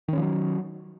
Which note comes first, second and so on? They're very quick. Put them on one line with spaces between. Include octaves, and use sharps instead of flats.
D#3 C#4 F3 F#3